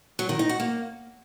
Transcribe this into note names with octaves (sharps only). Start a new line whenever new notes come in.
F#3
D#3
D#4
F#4
A#3